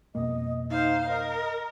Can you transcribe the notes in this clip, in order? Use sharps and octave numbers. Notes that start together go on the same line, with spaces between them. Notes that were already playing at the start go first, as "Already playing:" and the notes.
F2 B2 A#3 D#5
D#4 C5 F5
A#4 D#5